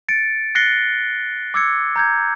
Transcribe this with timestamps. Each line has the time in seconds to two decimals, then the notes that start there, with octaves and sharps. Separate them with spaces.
0.09 A6 C#7 D7
0.55 F#6 A6 A#6 C7 C#7 G7
1.54 D6 E6 G#6 C#7
1.96 A#5 G6 G#6